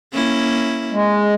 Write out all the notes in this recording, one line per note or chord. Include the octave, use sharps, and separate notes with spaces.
A#3 C#4 E4
G#3